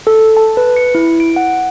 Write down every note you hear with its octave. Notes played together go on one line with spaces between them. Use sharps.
A4
A5
B4
C#7
E4
D7
F#5